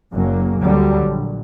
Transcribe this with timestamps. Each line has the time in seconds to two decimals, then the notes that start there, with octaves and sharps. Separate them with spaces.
0.13 F#1 F#3 A#3
0.62 D2 D3 F#3 G3
1.07 A#1